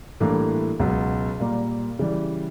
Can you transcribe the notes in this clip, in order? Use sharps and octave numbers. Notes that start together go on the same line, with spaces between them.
A2 E3 G3 A#3 D4
C#2 B2 F#3
A#2 G3 A#3
C#3 E3 G3